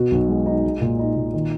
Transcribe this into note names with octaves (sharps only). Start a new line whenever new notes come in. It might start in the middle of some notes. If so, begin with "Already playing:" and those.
Already playing: B2 F#4
B1
G#3
D#4
G#3
A#2
D#4
A#2
D#3